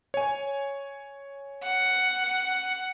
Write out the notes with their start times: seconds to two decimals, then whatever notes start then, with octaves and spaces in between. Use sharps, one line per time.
0.14 C#5 G#5
1.63 F#5